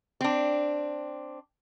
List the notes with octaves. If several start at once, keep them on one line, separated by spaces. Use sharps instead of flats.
C4 D4